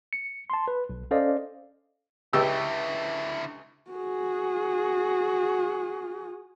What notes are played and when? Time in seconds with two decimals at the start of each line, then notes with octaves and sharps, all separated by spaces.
0.13 C#7
0.50 A5 C6
0.68 B4
0.89 B1
1.11 C#4 A4 C5 D5 D#5 F5
2.33 C#2 D3 E4 G4 E6
3.91 F#4 G#4